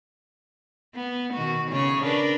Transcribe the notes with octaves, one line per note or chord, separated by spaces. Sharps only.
B3
B2 D#3 F#4
C#3 G#4 C#5
D4 A#4 B4